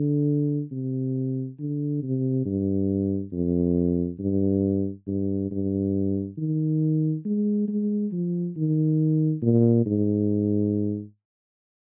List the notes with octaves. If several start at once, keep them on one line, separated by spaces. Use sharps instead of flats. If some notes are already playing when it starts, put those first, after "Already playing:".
Already playing: D3
C3
D3
C3
G2
F2
G2
G2
G2
D#3
G#3
G#3
F3
D#3
A#2
G#2